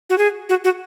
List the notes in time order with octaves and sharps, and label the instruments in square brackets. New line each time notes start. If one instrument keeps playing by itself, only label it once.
[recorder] F#4
G#4
F#4
F#4